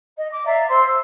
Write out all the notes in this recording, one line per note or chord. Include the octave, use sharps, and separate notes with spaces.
D#5
D6
D5 E5 F5 A#5
C5 C6 E6
E6